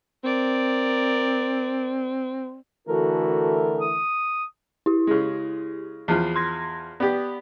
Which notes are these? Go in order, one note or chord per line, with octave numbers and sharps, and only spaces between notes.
C4 A#4 D5
D3 E3 A3 F#4 A#4
D#6
E4 G4
C#3 G#3
E2 F3 C7
C6 G#6 A#6
B3 G4 D5